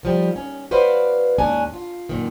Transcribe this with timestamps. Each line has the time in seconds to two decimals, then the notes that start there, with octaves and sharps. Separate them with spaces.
0.03 D#3 F3 G3
0.36 C#4
0.71 F#4 B4 C5 D5 F5
1.38 D#2 G#2 C#4 D4 G#5
1.73 F4
2.09 F#2 A#2 D#3